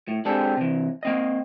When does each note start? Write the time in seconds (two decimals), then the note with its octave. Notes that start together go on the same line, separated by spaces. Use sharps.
0.08 A2
0.25 G#3 C4 D4 G4 A4
0.57 C3 E3
1.03 A#3 C4 D#5